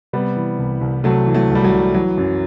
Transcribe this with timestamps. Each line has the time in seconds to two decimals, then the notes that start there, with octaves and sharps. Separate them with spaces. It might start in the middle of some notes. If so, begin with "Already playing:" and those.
0.13 C3 G3 B3
0.36 E3
0.59 C2
0.81 C2
1.04 C3 F#3 A3
1.27 E3
1.34 F#3 A3
1.50 C2
1.55 G3
1.64 F#3
1.72 C2
1.94 E3 F#3
2.18 F#2